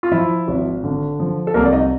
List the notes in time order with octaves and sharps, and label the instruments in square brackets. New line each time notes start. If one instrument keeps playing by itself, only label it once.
[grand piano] F4
F3 E4
G#1
D3
F3
A4
C2 A#3 A#4
D5
D#4 D#5